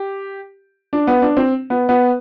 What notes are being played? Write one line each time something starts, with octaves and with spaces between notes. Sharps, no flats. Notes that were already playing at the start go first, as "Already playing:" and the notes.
Already playing: G4
D4
B3
D4
C4
B3
B3